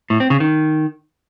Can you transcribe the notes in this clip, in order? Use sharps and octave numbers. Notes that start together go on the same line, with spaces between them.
A2
C4
C#3
D#3